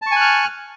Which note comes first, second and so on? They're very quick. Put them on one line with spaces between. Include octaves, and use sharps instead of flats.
A5 C#6 G#5 F#6 F6